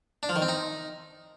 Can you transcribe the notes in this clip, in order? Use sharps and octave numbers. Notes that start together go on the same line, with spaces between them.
D4
F3
D#3
C4
D#4